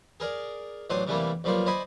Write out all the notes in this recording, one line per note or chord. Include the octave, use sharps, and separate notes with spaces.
G#4 A#4 D5
A1 F#3 D4 C5 C6 D#6
C3 E3 G3 A3 A#3
B1 F3 G3 A#3 C5
C5 D5 D#5 G#5 B5 C6